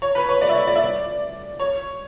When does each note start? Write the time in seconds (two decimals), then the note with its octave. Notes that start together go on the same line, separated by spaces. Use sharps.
0.02 C#5
0.15 B4
0.29 C#5
0.41 D5
0.49 E5
0.55 D5
0.67 D5
0.75 E5
0.83 D5
1.60 C#5